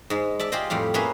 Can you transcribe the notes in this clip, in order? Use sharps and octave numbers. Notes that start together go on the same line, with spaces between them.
G#2 G#3
D5 E5 A5
F4 G4 G#4 C5 D#5
F2 A2 G3 F5
A#3 C#4 G#4 B4 E5 F5